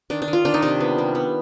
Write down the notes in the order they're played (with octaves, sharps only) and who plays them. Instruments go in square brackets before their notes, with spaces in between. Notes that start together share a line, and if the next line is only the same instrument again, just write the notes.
[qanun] D#3 D4
D4
D#3
F4
D#3 D4
D#4
C3 D4
B3
G3
B3